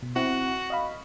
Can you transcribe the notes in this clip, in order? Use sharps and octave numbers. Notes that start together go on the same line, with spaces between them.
B2
C4 E4 F#4 F#5
D#5 F5 B5